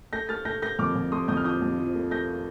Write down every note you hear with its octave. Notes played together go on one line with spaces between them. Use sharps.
A3 G6 A#6
A3 F6 A6
A3 G6 A#6
A3 G6 A#6
F2 D6 F6
F2
A3 C6 D#6
F2 D#6 G6
F6
F3 D#6 G6
F2
F3
A3
A3 G6 A#6